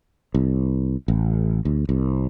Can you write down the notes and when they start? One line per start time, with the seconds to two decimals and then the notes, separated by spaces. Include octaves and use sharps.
0.34 C2
1.08 A1
1.65 D2
1.89 C2